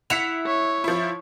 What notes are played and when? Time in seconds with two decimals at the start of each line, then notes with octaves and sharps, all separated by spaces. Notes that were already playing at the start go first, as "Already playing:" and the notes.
0.10 E4 E5 F#5 B6 C#7 F7
0.46 C#5
0.84 F3 E4